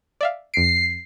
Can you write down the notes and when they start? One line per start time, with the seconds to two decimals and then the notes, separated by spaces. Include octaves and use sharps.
0.21 D5 E5 F5
0.54 F2 C7 D7